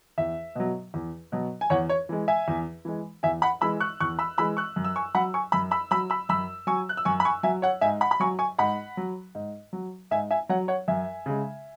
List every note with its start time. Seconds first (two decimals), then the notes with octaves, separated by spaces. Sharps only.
0.18 E2 E5
0.55 B2 F#3
0.94 E2
1.32 B2 F#3
1.61 G#5
1.70 E2 C#5 F#5
1.89 C#5
2.09 E3 G#3
2.28 E5 G#5
2.48 E2
2.85 E3 G#3
3.23 E2 E5 G#5
3.42 F#5 B5
3.61 E3 G#3 B5 E6
3.80 C#6 F#6
4.00 E2 C#6 F#6
4.19 B5 E6
4.38 E3 G#3 B5 E6
4.57 C#6 F#6
4.76 F#2
4.84 E6
4.96 G#5 C#6
5.14 F#3 F#5 B5
5.34 G#5 C#6
5.52 F#2 B5 E6
5.71 B5 E6
5.91 F#3 B5 E6
6.10 B5 E6
6.29 F#2 B5 E6
6.67 F#3 G#5 C#6
6.89 F#6
6.97 E6
7.05 F#2 G#5 C#6
7.20 B5
7.25 G#5 C#6
7.43 F#3 E5 G#5
7.62 C#5 F#5
7.81 G#2 E5 G#5
8.01 F#5 B5
8.11 B5
8.20 F#3 G#5 C#6
8.39 G#5 C#6
8.58 G#2 F#5 B5
8.97 F#3
9.35 G#2
9.73 F#3
10.11 G#2 E5 G#5
10.31 E5 G#5
10.49 F#3 C#5 F#5
10.68 C#5 F#5
10.88 F#2 E5 G#5
11.26 C#3 G#3